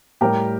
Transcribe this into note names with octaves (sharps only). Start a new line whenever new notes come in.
A2 G3 G4 A#4